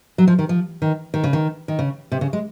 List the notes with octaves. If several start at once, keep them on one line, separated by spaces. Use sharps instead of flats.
F#3
F3
D#3
F3
D#3
D#3
C#3
D#3
D#3
C#3
C3
C#3
G#3